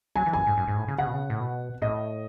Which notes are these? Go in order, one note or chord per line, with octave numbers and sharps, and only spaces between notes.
F#3 G#5
E3
F#2 G#5
G#2
F#2
G#2
A2
C#3
C#3 F#5
B2
C#3
A2
B2
A2 D#5